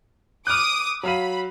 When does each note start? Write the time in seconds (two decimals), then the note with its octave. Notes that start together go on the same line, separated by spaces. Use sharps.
0.47 D6 D#6 F6 F#6
1.03 F#3 F5 B5 D#7